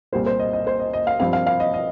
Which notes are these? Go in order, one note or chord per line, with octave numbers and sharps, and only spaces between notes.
C2 A#2 G3 A#3 C5
C5
D#5
D#5
C5
D#5
D#5
F5
G2 F3 C4 F5
F5
F5
D#5
D#5